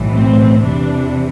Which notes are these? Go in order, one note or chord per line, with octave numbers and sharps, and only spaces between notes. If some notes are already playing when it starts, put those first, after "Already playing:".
Already playing: B1 A2 E3
C4
E2 C3 E3 D4